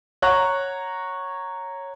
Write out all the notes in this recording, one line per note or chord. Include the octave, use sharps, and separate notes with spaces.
C#5 F#5 A#5 C#6 F#6